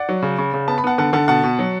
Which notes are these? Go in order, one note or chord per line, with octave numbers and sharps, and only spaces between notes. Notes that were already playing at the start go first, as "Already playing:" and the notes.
Already playing: D5 F#5
F#3
C#3
C#3
C#3
B3 A5
B5
B3 F#5 A5
D3 F#5 A5
D3 F#5 A5
B2 F#5 A5
B2
F#3